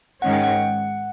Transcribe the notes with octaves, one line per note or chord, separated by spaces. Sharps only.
G#2 D#3 G#3 C#4 F#5
G5
F#5